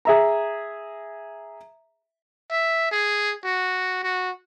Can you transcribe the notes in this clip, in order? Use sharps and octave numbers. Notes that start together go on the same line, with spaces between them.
G#4 E5 A#5
E5
G#4
F#4
F#4